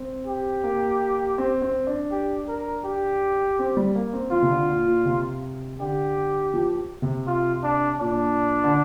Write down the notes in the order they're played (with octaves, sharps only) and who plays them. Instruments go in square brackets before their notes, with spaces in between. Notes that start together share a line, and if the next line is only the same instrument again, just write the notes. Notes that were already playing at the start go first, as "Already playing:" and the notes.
Already playing: [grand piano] C4
[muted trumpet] G4
[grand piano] A#3
C4
C4
D4
[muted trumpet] G4
A#4
G4
[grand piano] C4
G3
A#3
C4
[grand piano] F3 [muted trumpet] F4
[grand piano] C3
D3
A#2
A#2
C3
[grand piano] D3 [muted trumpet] G4
[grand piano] F3
C3
[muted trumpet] F4
D4
[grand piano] A#2 [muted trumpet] D4
[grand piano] D3